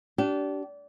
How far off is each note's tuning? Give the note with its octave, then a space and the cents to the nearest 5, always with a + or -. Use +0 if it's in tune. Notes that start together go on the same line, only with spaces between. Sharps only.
D4 -25 G4 -30